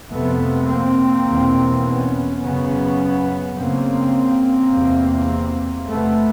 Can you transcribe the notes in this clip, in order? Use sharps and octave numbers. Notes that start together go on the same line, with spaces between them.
F2 C3 A3 B3
A#3 C4
E2 B2
B3 C#4
F#2 C#3 B3 C#4
F#2 C#3 A#3 C4
E2 C3
E2 C3 A3 B3